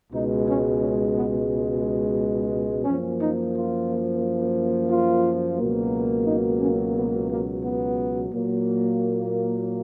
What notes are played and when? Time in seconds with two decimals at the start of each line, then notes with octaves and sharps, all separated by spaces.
0.12 C#2 B2 G#3 D#4
0.47 C#4
0.80 C#4
1.14 B3
2.85 F#2 F3 A#3 C#4
3.19 D#4
3.54 F4
4.90 F4
5.57 C#2 B2 F#3 A#3
6.26 D#4
6.60 C#4
6.95 B3
7.28 A#3
7.63 B3
8.31 A#2 F#3 A#3